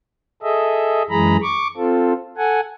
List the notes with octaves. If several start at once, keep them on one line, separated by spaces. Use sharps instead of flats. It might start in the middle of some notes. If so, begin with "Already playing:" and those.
G#4 A4 D#5 E5
F#2 E3 G#3 G#4 A#5 B5
C#6 D6
C4 F4 A4
A4 F#5 G#5